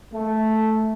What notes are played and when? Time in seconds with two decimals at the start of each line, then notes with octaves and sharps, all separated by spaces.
0.13 A3